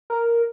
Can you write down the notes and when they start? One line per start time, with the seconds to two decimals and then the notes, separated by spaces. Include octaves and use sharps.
0.10 A#4